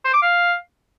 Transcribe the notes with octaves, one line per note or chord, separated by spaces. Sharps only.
C5
D6
F5